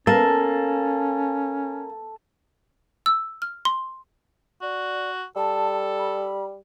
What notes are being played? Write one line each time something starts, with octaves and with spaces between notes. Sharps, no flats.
A#3 C#4 A4 A5
E6
F6
C6
F#4 D5
G3 A4 A5
B5